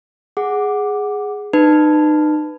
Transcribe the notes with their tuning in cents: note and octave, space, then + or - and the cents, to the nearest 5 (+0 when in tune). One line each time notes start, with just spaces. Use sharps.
G#4 +0 F#5 +0 D6 +0
D#4 -35 B4 +15 A5 +0